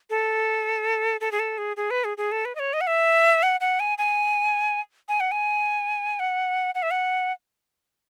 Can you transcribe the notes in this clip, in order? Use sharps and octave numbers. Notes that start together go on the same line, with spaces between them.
A4
A4
G#4
A4
G#4
G#4
B4
G#4
G#4
A4
B4
D#5
C#5
D#5
F#5
E5
F#5
F#5
G#5
G#5
G#5
F#5
G#5
F#5
F#5
E5
F#5